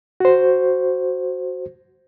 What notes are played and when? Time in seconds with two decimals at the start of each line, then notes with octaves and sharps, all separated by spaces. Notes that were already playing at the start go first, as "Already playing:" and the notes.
0.20 F#4 C5